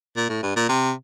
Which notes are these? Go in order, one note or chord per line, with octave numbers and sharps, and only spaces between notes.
A#2
A2
G2
A#2
C3